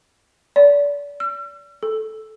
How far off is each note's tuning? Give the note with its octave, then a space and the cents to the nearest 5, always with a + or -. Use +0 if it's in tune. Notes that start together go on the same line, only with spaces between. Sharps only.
D5 -35
E6 +45
A4 -10